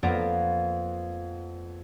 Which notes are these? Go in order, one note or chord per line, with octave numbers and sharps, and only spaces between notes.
F2 A#3 B3 A#4 D5